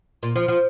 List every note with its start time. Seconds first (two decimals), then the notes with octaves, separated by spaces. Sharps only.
0.23 A#2
0.36 F3
0.48 F3